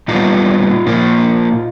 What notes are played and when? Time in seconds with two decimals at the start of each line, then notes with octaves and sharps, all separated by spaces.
0.08 A#2 G3 B3 D#4 F4
0.86 A#2 F3 A#3